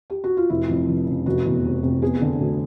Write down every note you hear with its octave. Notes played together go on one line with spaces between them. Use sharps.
G4
F#4
F4
F1 E4
F2
F1
C#3
F1 F#4
E2
F1
C3
B3 G#4
D3
D2